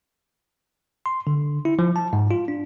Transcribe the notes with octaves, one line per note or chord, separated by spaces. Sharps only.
C6
D3
E4
F3
A5
G#2
F4
D4